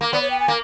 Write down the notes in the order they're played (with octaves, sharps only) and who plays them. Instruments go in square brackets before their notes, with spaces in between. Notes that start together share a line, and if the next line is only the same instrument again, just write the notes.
[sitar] A#3
[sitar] B3 [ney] D5
[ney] C#5
G5
G#5
[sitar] A#3